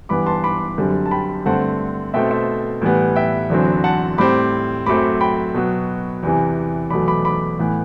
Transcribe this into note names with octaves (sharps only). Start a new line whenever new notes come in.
G2 E3 B3 B5 D6
A5 C6
B5 D6
F#2 D3 G3 C4
A5
G5 B5
G2 D3 A3 C4 F#5 A5
B2 A3 C4 E5 G5
C5 E5
A2 E3 G3 B3
E5 G5
E2 D3 F#3 C4
F#5 A5
A2 G3 C4 B5 D6
F#2 F#3 A3 C4 B5 D6
G5 B5
B2 F#3 B3
E2 C3 E3
E2 B2 F#3 A3 B5 D6
B5 D6
B5 D6
A2 E3 B3